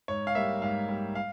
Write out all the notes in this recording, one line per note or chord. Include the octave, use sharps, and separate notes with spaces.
G#2 C#5
F5
G3 A#3 E5
G#2 F5
G3 A#3
F5